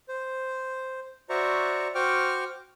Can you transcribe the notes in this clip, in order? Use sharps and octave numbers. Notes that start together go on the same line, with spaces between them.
C5
F#4 C5 D5 E5 A#5 C#6
F#4 C5 G5 C#6 D6 F6